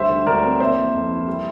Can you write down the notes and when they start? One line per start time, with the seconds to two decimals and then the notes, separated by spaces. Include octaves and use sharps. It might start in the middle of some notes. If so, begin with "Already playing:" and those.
Already playing: D2 G3 C5 E5
0.10 D3
0.26 D2 A#4 D5
0.43 C4
0.60 A#3 C5 E5
0.76 E3
0.94 F2
1.10 E4
1.27 G3